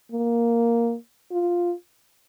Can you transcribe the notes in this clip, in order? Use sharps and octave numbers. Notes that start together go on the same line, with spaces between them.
A#3
F4